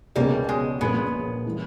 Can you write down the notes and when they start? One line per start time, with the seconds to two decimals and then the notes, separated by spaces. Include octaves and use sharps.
0.16 C#2 B2 G3 G#3 A#3 C#4
0.49 G#3
0.81 A#1 A#2 G3 G#3 A#3 B3 C#4
1.46 E3 G3